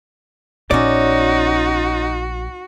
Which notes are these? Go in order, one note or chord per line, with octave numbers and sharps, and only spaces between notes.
A#1 B3 C#4 D#4 F#4 D5